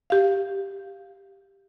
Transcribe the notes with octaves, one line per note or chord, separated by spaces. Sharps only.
G4 F5